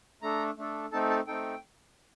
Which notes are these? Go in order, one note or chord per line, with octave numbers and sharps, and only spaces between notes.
A3 D4 A4 A#5
A3 D4 A4
A3 C4 D#4 A4 A5
A5
A3 C4 D#4 A4 G5